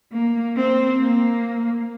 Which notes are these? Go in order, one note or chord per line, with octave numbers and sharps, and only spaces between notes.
A#3
C4
A#3